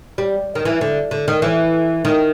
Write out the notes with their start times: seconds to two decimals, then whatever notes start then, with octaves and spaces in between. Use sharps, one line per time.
0.18 G3
0.55 D#3
0.65 E3
0.81 D3
1.11 D3
1.28 D#3
1.42 E3
2.05 D#3